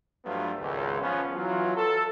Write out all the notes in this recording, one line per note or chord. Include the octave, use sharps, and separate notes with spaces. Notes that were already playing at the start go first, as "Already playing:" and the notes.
G2 F3 F#3 A3 B3 F4
G#1 C#2
F3 B3 C#4
E3 F#3 F4
A4